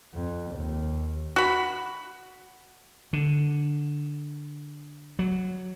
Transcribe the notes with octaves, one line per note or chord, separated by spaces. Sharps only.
F2
D#2
F#4 B5
D3
F#3